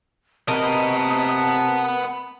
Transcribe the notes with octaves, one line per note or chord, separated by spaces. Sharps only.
C3 B3 A#4 D#5 A5